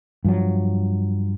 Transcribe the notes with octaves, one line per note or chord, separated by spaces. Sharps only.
G2 F3 F#3